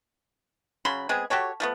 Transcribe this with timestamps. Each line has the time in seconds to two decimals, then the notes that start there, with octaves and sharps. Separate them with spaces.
0.85 C#3 F#3 B5 C6
1.09 G#3 B3 C4 G#4
1.30 F#4 G4 A4 C#5
1.60 F3 A3 B3